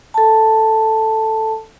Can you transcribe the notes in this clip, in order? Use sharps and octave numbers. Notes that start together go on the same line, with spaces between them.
A4 A5